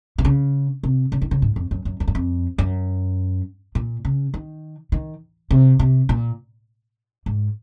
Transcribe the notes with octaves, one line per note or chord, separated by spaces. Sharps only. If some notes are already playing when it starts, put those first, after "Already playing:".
C3
C#3
C3
C#3
D#3
C#3
G#2
F2
F#2
F#2
F2
F#2
F2
F#2
A#2
C#3
D#3
D#3
C3
C3
A#2
G#2